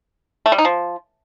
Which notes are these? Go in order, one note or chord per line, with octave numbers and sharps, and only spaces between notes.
A3
G3
D#4
F3